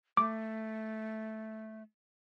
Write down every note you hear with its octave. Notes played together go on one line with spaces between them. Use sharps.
A3 D6